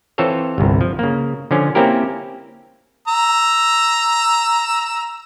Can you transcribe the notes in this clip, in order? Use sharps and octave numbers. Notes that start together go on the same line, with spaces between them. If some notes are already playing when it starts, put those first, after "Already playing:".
E3 C4 F4 A4 C5 C#5
G1 C2
F3
C#3 A#3
D3 F3 C#4
A#3 C4 C#4 E4 G4 A#4
A#5 E6